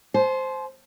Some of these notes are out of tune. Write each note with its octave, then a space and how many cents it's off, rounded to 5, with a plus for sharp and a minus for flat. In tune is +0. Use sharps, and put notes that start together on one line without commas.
C5 +0 A5 -45